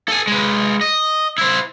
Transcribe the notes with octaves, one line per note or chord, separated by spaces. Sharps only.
A4 G#5
G#3 B4
D#5
E4 C5